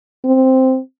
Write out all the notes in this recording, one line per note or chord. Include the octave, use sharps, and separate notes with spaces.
C4